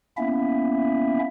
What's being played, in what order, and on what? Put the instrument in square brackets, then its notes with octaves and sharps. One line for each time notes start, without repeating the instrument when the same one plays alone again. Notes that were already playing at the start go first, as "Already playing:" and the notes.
[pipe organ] A#3 B3 C#4 E4 E5